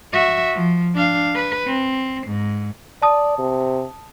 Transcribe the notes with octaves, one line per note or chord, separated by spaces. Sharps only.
F#4 E5
F3
D4 F5
B4
C4
G#2
D5 A5 D#6
C3